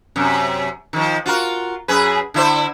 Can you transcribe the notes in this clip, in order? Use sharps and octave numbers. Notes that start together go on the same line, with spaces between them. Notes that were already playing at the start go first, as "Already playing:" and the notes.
F#2 C3
D#3 F3
F4 F#4 A#4
F#2 G#4 B4
D3 E4 C5